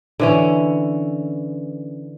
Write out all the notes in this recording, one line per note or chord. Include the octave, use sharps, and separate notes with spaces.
D3 E3 C#4